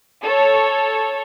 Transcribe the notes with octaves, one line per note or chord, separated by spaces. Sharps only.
A4 C#5